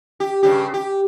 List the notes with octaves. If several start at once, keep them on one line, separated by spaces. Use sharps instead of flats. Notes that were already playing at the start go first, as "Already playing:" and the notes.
G4
G2 C#3 G4
G4